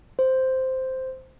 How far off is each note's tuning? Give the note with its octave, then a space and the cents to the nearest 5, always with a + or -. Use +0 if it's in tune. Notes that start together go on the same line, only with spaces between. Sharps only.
C5 -5